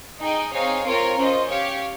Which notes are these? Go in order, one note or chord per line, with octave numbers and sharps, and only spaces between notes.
D#4 G#4 D#5 G5
C4 D#4 G#4 C#5 F5
C4 F4 A#4 C#5
C#4 F4 C5 D#5
G4 C#5 F5